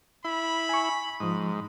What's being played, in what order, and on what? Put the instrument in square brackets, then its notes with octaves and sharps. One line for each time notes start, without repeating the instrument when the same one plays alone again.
[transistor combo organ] E4 [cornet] B5
[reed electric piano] G#5 C#6
[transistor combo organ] G#2 [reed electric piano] F3 D#6